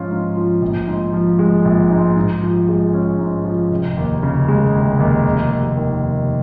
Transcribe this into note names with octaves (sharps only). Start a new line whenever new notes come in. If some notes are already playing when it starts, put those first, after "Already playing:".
Already playing: G#2 F3 C#4 F4
G#2
F3
A#1
G#2
F3
G#3
A#1
G#2
G#2
F3
G#3
C#4
G#2
F3
F1
D#2
C#3
G#3
F1
D#2
F1
D#2
D#3
F1